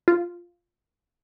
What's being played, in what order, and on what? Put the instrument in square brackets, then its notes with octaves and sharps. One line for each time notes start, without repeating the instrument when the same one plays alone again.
[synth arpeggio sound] F4